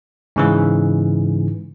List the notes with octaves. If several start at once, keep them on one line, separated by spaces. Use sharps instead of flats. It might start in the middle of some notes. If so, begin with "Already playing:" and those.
G#2 C#3 E3